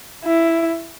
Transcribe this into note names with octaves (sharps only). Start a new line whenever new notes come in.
E4